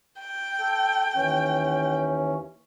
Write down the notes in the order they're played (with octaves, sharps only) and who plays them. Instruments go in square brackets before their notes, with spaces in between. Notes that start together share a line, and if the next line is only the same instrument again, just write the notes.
[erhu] G5
[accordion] A4 G6
D#2 E3 C#4